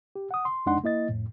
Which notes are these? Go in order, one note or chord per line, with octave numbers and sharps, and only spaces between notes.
G4
F#5 D#6
C6
F2 G#3 D4 D#4 F#5 C6
A#3 E4 D#5 A6
F2 A2